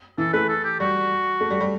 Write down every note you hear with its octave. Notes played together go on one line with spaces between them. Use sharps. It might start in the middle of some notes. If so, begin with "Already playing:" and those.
E3 A4
A3 B4
A4
G4
G3 F#4
A3
G3
G3